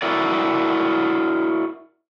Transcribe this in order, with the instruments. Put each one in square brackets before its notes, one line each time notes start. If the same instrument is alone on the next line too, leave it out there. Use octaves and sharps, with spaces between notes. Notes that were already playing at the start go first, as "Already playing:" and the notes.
[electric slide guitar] E4 F#4 A#4 D5